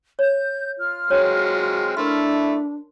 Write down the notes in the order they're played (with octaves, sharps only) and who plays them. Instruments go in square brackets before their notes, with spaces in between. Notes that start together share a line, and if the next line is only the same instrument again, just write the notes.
[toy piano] C#5 [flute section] G6
[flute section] F4 F6
[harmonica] F#3 G#3 C4 [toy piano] B4 C#5
[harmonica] A3 E4 [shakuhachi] D4 [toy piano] A#4 C6